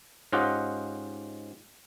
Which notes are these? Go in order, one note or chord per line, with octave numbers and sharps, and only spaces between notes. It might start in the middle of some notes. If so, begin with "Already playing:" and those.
G#2 C#4 F4 G4 D#5 F#5